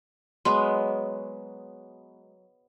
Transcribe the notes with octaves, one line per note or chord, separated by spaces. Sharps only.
F#3 G#3 B3 C6